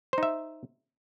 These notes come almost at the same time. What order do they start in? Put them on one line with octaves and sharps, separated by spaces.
C5 D#4 E5